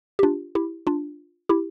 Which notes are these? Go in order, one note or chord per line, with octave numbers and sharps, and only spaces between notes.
G4
D4 F4
E4 G4
D4 F4
E4 G4